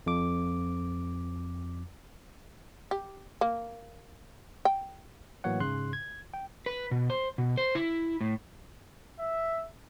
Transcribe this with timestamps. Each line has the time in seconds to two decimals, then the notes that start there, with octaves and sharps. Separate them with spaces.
0.06 F2 D6
2.91 G4
3.41 A#3
4.65 G5
5.44 A2 E3 F#3 A#3 C#5 F#5
5.60 G#2 C#3 C6 F#6
5.93 G#6
6.34 G5
6.66 B4
6.91 B2
7.10 C5
7.38 B2
7.58 C5
7.75 E4
8.21 A2
9.19 E5